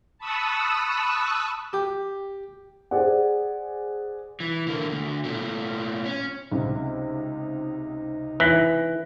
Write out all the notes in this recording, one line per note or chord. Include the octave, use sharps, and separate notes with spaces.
A5 B5 C#6 D#6 E6 F#6
G4
G#4 C5 D5 F#5
E3
D3 A#3
D2 D3
A#2 A3
C#4
C#2 C3 D#4
E3 F#6 A#6 B6